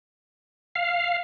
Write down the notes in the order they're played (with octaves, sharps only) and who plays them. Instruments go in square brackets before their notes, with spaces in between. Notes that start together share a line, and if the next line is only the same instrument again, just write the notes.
[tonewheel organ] F5